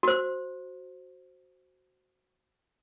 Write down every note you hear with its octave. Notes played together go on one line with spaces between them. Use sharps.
F#4 C5